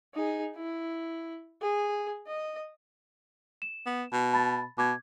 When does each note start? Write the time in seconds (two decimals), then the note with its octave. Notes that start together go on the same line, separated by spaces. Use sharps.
0.14 D#4 G#4
0.56 E4
1.61 G#4
2.28 D#5
3.62 E7
3.86 B3
4.13 B2
4.33 A5 B5 A6
4.78 B2 D6 G#6